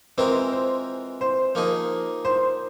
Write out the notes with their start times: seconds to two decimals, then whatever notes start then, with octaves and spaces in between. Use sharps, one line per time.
0.17 E3 G#3 C4 F4 A#4 C5
0.52 C5
1.21 C5
1.55 F3 A#3 D#4 G#4
2.25 C5